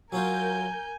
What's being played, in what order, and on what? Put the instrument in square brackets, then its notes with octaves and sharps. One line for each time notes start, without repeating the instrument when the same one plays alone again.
[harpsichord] F#3 C#4 F4 [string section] A#4 G6 [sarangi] G#5